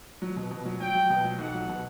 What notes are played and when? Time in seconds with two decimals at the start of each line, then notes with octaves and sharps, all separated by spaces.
0.22 F#3
0.37 B2
0.51 B2
0.65 F#3
0.80 F#3 G5
0.95 F#3
1.10 B2
1.24 F#3
1.39 B1 F#5
1.54 F#3
1.69 B2